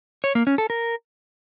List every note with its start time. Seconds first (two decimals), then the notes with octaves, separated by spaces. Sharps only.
0.24 C#5
0.35 A#3
0.47 C#4
0.58 A4
0.70 A#4